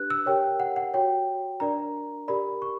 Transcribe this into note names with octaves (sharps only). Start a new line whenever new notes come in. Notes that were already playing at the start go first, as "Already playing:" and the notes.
Already playing: D4 G4 B4 F#6
E6
G4 A#4 C#5 G5
F#5
F#5
F#4 C#5 G5
D4 A#4 D5 A#5
G4 A#4 D5 B5
C#6